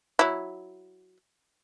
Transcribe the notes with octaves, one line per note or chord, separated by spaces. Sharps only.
F#3 E4